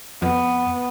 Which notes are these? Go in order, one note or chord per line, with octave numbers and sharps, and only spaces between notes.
F2 B3